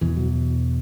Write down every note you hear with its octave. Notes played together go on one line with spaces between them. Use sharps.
E2 B2 E3
F#3